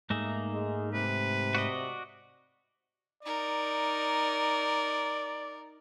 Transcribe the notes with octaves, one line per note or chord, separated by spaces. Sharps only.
G#2 A3 A#3 D#4 G#4 E5
G#3
C3 B4
F#4 D5 D#5
D#4 A#4 D5